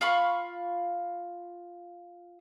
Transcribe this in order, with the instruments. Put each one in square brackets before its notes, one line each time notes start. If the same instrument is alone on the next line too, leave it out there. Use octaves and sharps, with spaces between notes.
[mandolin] F4 F5 B5 C#6